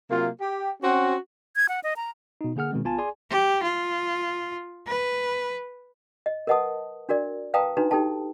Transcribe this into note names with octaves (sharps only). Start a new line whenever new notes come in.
C3 F#3 A#3 F4
G4
C4 C#4 F#4
G#6
F#5
D#5
A#5
B2 D#4
D3 A#3 G#4 F#5 F6
B2 D#3 G#3 C4
G#1 B3 F4 G#5 A5
G#4 D5 G#5 C6
G4
F4
B4
D#5
A#4 B4 D#5 F#5 A5 D#6
D4 F#4 A#4 D5
B4 F5 G5 A5 A#5 D#6
D4 D#4 F#4 B4 A#5
D#4 G4 A4 G5 A5